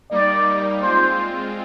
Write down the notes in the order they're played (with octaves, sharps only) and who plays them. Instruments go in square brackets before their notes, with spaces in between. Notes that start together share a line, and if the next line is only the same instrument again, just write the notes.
[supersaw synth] G3 A#3 D#4 [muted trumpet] D5
[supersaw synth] G#3 C4 F4 [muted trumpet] C5